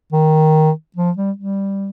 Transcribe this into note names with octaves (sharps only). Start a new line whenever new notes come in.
D#3
F3
G3
G3